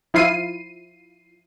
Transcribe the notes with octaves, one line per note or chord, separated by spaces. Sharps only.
F3 E4 F4 C7 D#7